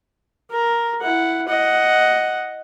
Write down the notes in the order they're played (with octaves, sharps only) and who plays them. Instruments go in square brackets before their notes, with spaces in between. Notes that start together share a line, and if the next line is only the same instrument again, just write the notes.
[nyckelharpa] A#4
E4 F#5
D#5 F#5